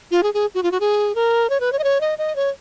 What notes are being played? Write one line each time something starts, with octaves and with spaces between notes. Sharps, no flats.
F4
G#4
G#4
F#4
F4
F#4
G#4
A#4
C#5
B4
C#5
D#5
C#5
D#5
D#5
C#5